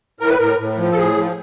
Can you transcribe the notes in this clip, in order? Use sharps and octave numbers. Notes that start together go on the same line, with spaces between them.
A2 A#4
B4
A2 A#4
A2
F3
A4
A2 G#4
F3